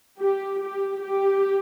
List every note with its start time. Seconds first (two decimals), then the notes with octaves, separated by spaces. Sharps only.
0.20 G4
0.62 G4
1.04 G4